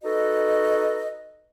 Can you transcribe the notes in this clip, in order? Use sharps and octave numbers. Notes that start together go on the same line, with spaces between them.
D#4 F#4 A4 B4 D#5